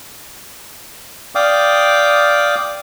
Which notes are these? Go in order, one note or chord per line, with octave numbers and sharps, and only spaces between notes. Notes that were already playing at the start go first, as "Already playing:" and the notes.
D5 F5 G5 D6 D#6